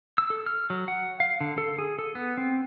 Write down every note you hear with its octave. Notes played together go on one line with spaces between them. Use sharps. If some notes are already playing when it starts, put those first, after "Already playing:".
E6
A4
F6
F#3
F#5
F5
D3
A4
G#4
A4
B3
C4